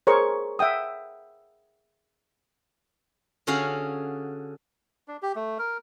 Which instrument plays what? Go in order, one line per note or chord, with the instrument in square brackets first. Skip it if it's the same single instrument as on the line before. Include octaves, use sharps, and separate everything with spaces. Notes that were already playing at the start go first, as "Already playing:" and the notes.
[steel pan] G#4 A#4 C5 C#5 C#6
E5 F#5 G5 D#6
[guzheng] D3 C#4 F#4 G#4 F5 F#5
[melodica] D4
G4
A3
A#4